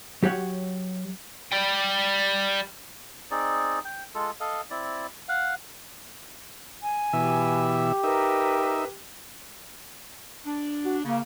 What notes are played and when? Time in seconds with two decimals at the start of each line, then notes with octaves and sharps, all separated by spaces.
0.23 F#3 G4 C#5 F#5
1.52 G3 G5
3.31 C4 D#4 G#4 D5
3.85 G5
4.15 G#3 F4 A4
4.40 A4 D#5 F5
4.70 C4 E4 D5
5.28 F5 F#5
6.81 G#5
7.13 B2 E3 G4 E5
8.04 D#4 A#4 B4 E5
10.45 D4
10.85 F#4
11.04 C#3 A#3